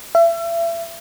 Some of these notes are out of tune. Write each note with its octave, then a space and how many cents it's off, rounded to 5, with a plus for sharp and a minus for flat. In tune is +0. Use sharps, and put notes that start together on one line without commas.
E5 +35